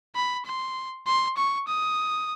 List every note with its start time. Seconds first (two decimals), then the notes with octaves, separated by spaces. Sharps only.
0.16 B5
0.46 C6
1.07 C6
1.37 C#6
1.67 D#6